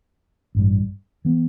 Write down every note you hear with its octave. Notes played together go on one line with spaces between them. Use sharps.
A1 G2 G3
E3 B3